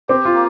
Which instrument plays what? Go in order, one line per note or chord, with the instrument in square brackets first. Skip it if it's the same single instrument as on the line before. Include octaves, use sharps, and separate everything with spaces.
[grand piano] C4 [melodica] G4
[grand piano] F4
[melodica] A#3